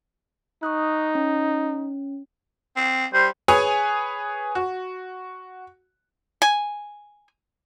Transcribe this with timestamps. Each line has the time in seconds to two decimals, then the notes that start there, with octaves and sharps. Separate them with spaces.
0.63 D#4 C#6 D#6 F#6
1.15 C#4
2.76 C4
3.14 G3 C5
3.48 G#4 B4 C#5 G#5 D#6
4.55 F#4
6.42 G#5